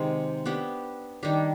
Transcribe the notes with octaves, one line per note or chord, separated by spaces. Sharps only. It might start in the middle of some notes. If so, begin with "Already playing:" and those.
Already playing: C3 D#3 G#3
B3 D4 G4
D#3 G3 D4 G4